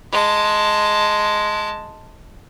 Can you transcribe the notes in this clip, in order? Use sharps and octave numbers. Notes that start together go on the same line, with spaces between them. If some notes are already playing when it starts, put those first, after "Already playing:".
G#3 A5